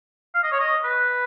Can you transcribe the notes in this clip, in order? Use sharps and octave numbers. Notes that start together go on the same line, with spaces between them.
F5
D#5
C#5
D#5
B4